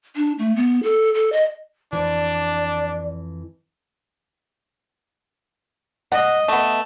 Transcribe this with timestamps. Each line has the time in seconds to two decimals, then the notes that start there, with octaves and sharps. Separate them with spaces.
0.16 D4
0.39 A3
0.56 B3
0.83 A4
1.14 A4
1.32 D#5
1.93 F2 E3 D4 D5
6.12 D#5 F#5
6.48 A3 B3